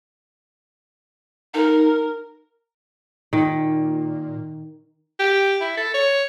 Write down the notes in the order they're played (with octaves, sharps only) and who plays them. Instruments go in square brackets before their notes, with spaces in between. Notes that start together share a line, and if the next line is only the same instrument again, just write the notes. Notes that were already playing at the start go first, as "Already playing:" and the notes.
[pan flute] D#4 [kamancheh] A#4
[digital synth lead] A#2 [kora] D#3
[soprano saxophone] G4
E4
A4
C#5